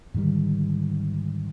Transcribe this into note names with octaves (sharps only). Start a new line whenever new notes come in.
G#2 D3 D#3 G3